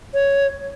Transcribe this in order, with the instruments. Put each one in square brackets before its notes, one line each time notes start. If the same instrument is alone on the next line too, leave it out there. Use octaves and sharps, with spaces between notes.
[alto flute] C#5